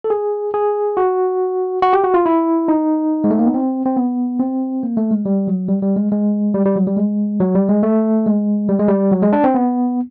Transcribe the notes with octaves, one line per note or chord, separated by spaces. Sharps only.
A4
G#4
G#4
F#4
F#4
G4
F#4
F4
E4
D#4
G#3
A3
A#3
B3
C4
C4
B3
C4
A#3
A3
G#3
G3
F#3
G3
G3
G#3
G#3
G3
G3
F#3
G3
G#3
F#3
G3
G#3
A3
G#3
G3
G#3
G3
F#3
G#3
D4
C4
B3